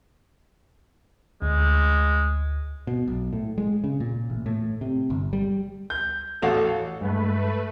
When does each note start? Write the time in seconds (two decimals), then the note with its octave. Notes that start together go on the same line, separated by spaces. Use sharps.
1.42 D2 G#3
2.87 B2
3.08 B1
3.33 A2
3.58 G#3
3.84 C#3
4.00 A#2
4.30 A1
4.46 A2
4.81 C3
5.10 G1
5.33 G3
5.90 G6
6.42 A1 F#4 A4 F5 F#5
7.01 G2 G#3 A3 B4